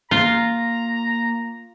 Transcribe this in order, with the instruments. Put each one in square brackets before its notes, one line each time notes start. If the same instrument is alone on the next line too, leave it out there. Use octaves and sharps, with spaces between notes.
[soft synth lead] A#3 [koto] F4 [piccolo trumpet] A#5